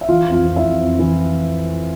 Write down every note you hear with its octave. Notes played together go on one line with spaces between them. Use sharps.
E5
E3 F4 F5
F2
F4 F5
F2
E4 E5
F2
F2
E3